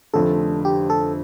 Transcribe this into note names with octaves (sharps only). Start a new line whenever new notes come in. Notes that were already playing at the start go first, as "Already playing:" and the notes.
F1 F2 D3 A3 A4
G4
A4